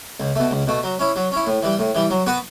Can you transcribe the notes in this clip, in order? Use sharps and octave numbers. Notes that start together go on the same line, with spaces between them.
C#2
B2 A3
C#2
B2 A3
F#3
C#4 E4
F#3
C#4 E4
A2
E3 G3
A2
E3 G3
F#3
B3 F#4 B4